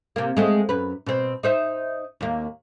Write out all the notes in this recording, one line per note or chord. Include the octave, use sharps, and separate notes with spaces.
C3 A#3
G#3 A3 C4
F#2 B4
B2 C4
D#4 C5 E5
D#2 A#3